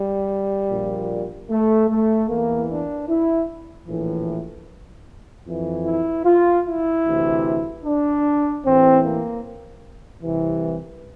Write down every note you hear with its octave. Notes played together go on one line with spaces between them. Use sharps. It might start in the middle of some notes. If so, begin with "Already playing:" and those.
Already playing: G3
A#1 A#2
A3
A3
E2 E3 A#3
D4
E4
A#1 A2 E3
F2 E3
E4
F4
E4
D2 C3 E3
D4
A1 A2 E3 C4
A#3
C2 C3 E3